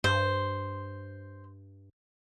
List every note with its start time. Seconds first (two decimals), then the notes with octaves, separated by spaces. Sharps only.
0.04 G2 C5